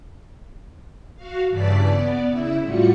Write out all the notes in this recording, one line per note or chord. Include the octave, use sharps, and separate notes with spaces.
F#4 F5
G2 C#3 E3 D5 A5 B6
B3 D5
C#3 E4 E5
A2 G3 F4 F#4 C#7